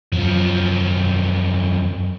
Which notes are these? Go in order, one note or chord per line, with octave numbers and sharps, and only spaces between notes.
F#2 F3